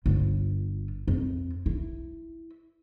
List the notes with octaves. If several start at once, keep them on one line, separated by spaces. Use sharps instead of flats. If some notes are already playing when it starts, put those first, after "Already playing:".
G1 F4
F2
E4